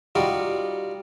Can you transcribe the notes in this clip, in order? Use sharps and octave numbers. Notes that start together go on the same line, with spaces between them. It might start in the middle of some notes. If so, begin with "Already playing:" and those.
G3 D#4 F4 F#4